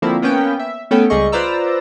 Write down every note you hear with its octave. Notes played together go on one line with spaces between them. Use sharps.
D3 F3 A#3 C4 E4
A#3 B3 C#4 G5
E5
A3 B3 C#4 A4 G5
C#2 G3 G#4 D#5 C#6
F4 B4 C5 D5 A#5 E6